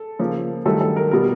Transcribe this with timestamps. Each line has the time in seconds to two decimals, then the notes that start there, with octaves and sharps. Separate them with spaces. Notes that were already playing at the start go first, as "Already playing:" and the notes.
Already playing: A4
0.19 C#3 F3 A#3
0.66 G2 D#3 F#3 A3 A4
0.81 A4
0.96 A#4
1.11 B2 G3 A#4